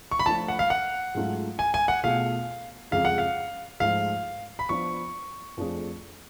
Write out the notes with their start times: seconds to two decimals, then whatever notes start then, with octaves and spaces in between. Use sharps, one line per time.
0.11 C#6
0.19 B5
0.26 F3 A3 D4 F4 A5
0.48 F#5
0.59 F5
0.70 F#5
1.15 G#2 F#3 A3 C#4 F4
1.59 G#5
1.74 G#5
1.88 F#5
2.04 B2 A3 F4 G#4 F5
2.91 F2 C#3 G#3 F5
3.05 F#5
3.18 F5
3.80 G#2 F3 A3 F4 F5
4.59 B5
4.69 F3 B3 D4 C#6
5.57 F2 F3 A3 D4 G#4